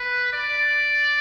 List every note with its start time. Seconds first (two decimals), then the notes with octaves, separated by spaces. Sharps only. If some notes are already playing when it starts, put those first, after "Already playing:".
Already playing: B4
0.33 D5